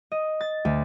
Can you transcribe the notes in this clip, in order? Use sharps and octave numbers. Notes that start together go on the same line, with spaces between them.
D#5
A6
D2